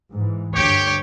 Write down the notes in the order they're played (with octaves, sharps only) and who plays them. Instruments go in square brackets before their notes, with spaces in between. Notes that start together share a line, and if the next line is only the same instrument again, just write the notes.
[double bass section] G#2 E3
[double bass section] D2 G2 [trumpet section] G4 [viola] C#5